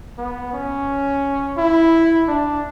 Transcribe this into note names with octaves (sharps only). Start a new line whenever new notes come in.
B3
C#4
E4
D4